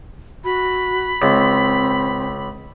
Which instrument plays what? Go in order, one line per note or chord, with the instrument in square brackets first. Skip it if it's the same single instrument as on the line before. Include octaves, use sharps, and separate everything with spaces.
[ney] F#4 [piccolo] B5
[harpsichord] C#2 [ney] C4